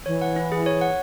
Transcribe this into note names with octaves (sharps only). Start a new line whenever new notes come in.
E3 C#5
F#5
E4
G#4
C#5
F#5